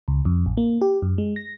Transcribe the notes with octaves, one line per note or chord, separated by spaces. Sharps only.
C#2
F2
A1
A#3
G4
F#2
G#3
A#6